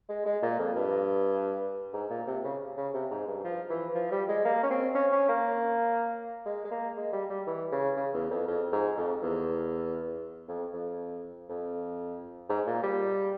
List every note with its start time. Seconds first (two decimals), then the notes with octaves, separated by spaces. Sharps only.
0.09 G#3
0.26 G#3
0.43 A#2
0.59 F2
0.76 G2
1.93 G#2
2.10 A#2
2.27 C3
2.44 C#3
2.77 C#3
2.94 C3
3.11 G#2
3.27 G2
3.44 F3
3.70 E3
3.95 F3
4.11 G3
4.28 G#3
4.45 A#3
4.63 C#4
4.70 C4
4.95 C#4
5.12 C#4
5.28 A#3
6.46 G#3
6.65 G#3
6.71 A#3
6.97 G#3
7.13 G3
7.30 G3
7.47 E3
7.72 C#3
7.97 C#3
8.14 E2
8.30 F2
8.47 F2
8.72 G#2
8.97 F2
9.23 E2
10.48 F2
10.74 F2
11.49 F2
12.49 G#2
12.66 A#2
12.83 G3